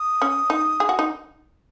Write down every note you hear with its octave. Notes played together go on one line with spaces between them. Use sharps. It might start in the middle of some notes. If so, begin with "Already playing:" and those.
Already playing: D#6
C#4
D#4
G#4
F#4
D#4